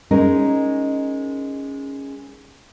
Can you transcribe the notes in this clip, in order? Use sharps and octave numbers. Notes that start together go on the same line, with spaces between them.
G#3 C#4 D#4 A#4